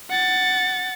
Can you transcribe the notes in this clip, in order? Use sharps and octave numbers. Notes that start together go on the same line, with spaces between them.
F#5 A6